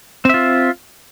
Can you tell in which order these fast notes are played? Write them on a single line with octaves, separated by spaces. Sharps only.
C4 E5 F4